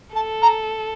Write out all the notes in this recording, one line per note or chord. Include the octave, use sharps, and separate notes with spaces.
A4 A5
A#5